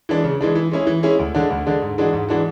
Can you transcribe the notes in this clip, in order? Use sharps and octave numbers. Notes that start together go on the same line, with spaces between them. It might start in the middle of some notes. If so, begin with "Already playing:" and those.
E3 G#3 D4
C#3
E3 G#3 D4
E3
G#3 C#4 E4 G#4
E3
G#3 C#4 E4 G#4
D2
D3 G#3 D4
D2
D3 G#3 D4
G#2
E3 G#3 D4 F#4
G#2
E3 G#3 D4 F#4